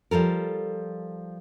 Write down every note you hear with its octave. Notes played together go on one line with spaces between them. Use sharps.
F3 G3 A4 A#4